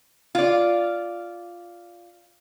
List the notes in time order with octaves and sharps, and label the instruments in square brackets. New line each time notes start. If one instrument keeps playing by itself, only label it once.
[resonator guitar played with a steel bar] F4 D5